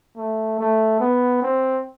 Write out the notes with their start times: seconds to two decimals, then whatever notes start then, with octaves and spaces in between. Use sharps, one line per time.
0.17 A3
0.59 A3
1.00 B3
1.42 C4